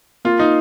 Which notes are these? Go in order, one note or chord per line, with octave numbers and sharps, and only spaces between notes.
A#3 F4
D#4